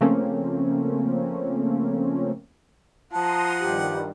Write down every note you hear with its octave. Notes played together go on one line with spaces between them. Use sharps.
C#3 F3 A3 A#3 C4 C#4
F3 F#5 A5 A#5 C6 D#6
G2 D#3 G3 G4